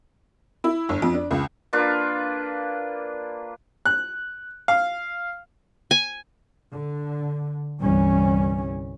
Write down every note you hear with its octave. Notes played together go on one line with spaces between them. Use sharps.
E4
G1
F2
D4
C#2
A#3 D4 F4 B4
F#6
F5
G#5
D3
G1 C2 E3 G3 C#4